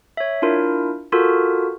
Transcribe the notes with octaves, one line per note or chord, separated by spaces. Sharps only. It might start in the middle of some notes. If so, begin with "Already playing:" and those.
C#5 E5
D4 E4 F4 A#4
F4 F#4 A4 A#4